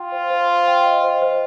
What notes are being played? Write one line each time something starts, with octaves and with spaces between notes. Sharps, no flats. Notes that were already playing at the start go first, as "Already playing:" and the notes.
Already playing: F4 G5 C6
C5
C5
C5
G5
D#5
C5
C5